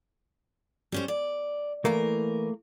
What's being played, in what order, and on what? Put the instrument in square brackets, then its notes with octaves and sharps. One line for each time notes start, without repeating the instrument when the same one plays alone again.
[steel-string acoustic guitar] G3 C#4 C5
D5
[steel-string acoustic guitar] E3 A#4 [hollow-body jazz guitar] A3 A#3